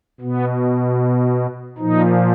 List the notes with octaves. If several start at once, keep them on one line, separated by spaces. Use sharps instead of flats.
B2 B3
A#2 F3 D#4